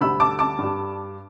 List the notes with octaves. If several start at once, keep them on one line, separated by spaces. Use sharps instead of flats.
D2 D3 G3 B5 E6
A5 D6
A5 D6
G2 G3